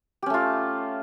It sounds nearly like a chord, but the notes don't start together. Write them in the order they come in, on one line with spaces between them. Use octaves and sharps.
G4 C#4 A3 F4